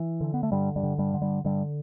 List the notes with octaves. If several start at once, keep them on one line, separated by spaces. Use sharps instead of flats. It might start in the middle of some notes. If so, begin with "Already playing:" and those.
Already playing: E3
D3
B3
A3
G2 D3 G3
G2 G3
D3
G2 G3
D3
G2 G3
G2 D3 G3